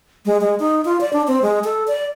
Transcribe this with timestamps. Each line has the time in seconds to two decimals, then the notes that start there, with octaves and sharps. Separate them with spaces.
0.26 G#3
0.41 G#3
0.60 D#4
0.85 F4
1.01 D5
1.13 D4
1.27 C4
1.42 G#3
1.64 A4
1.88 D5